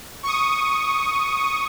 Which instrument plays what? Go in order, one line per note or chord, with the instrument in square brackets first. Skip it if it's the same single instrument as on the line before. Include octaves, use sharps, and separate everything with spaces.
[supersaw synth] C#6 D#6